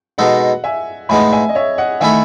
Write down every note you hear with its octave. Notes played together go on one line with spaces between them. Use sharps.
B2 G#3 D#4 A4 D#5 F#5
E5 G#5
A2 G#3 B3 D#4 G#5 B5
E5 G#5
D#5
C#5 E5
D#5 F#5
D#3 A3 E4 A4 E5 G#5